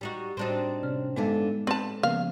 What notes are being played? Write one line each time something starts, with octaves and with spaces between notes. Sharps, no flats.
G3 D#4 F#4
A2 G3 C4 D4 D#4 F#4
C3 C#4 F6
G2 D3 G#3 B3 D#4 E4 A4
C4 B4 A5
C#3 F3 A#3 B3 F5